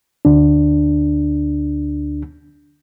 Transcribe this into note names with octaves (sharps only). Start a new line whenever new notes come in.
D2 D4